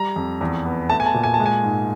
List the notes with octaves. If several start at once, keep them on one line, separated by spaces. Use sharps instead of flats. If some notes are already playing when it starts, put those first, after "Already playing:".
Already playing: G3 A#5
F2
E2
B3
A3 A5
G#5
A5
A#2
G#5
A5
G#3
G#5
G#2